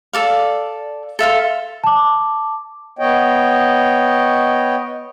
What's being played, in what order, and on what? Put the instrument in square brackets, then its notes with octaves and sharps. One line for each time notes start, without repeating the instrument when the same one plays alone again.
[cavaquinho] A4 D5 F5
A4 E5 F5 C6
[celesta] A5 D6
[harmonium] B3 C#5 D#5 G5